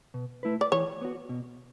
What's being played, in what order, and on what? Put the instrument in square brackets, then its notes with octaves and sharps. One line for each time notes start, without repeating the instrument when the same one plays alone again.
[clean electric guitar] B2
A3 E4 B4
[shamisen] D5
[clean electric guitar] E3 [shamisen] C#5
[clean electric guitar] B3 F#4
B2